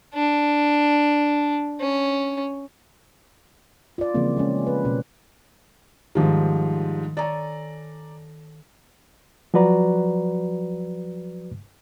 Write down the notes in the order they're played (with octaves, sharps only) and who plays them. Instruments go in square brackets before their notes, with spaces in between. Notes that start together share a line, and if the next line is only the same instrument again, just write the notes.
[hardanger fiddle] D4
C#4
[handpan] F4 D5
C#3 E3 F3 G3 A#3 C4
G#3 C#4
B4
B2 C#4
[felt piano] G#2 F3 G3 [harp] D#3
[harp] A4 C#5 G#5 [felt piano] D5 A#5
[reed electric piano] F3 F#3 F#4 B4 D5 A#5